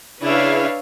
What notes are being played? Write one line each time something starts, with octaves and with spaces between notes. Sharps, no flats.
C#3 D4 E4 B4 C#5 E5 F5